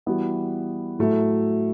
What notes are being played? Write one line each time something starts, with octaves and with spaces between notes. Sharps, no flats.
E3 G3 B3 F#4
A2 F#3 A3